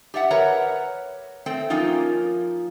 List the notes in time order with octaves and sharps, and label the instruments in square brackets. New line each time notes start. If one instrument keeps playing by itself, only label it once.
[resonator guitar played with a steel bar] G4 D5 E5 F#5
A#4 B4 C#5 E5 F#5 A#5
A3 C4 C5 G5
F3 A#3 C#4 D#4 F4